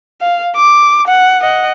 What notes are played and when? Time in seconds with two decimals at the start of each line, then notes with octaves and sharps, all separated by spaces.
0.21 F5
0.56 D6
1.08 F#5
1.42 D#5 F#5